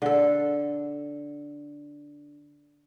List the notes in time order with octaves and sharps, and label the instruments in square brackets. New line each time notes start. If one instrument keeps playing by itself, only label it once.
[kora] D3 A4